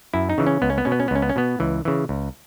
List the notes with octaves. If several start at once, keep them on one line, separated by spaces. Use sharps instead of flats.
F#2 E4
D#4
C#3 E3
C#4
C#2 B3
C#4
B3
B2 C#4
B3
C#4
B3
C#2 C#4
B3
C#4
B2 B3
C#2 E3
C#3 E3
C#2